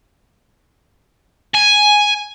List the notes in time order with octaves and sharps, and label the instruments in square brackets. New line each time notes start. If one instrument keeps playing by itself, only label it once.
[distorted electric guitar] G#5